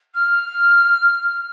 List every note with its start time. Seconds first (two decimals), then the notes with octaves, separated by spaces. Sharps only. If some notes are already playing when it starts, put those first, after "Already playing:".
0.14 F6